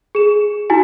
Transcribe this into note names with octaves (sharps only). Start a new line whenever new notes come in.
G#4 E7
D#4 E4 F#4 G#5